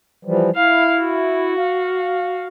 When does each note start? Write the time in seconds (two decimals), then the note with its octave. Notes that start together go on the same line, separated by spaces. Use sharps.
0.25 E3 F3 G3
0.55 E4 F5
0.99 F#4
1.58 F5